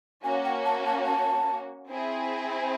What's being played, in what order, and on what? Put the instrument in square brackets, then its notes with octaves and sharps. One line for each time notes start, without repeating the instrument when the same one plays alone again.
[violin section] A#3 C#4 F#4 [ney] G#5
[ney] G5
A5
A5
A5
[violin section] C4 E4 G#4